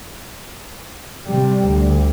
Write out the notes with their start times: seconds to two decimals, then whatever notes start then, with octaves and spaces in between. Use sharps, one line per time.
1.27 C3 G3
1.66 D2